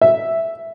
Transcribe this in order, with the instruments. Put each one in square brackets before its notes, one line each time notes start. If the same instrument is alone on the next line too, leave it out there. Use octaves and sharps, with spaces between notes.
[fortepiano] E5